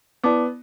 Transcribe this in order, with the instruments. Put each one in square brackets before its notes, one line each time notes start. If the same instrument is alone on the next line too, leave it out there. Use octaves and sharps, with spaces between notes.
[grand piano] B3 [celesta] E4 D5 A5 D6